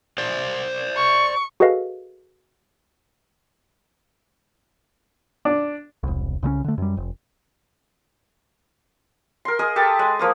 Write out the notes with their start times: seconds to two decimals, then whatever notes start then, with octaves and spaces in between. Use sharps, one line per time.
0.18 C5 D5
0.97 C#6
1.60 F#4 G#4 A4 B4 D#5 F5
5.45 D4
6.03 E1 C2
6.42 C2 C#3 G#3 C#4
6.64 D3 A3
6.78 F#2 G3
6.97 F1
9.45 A#4 C6
9.59 G#4 A#4 D#5
9.76 G4 A4 B4 A5
9.99 G#3
10.19 F3 A#3 D#6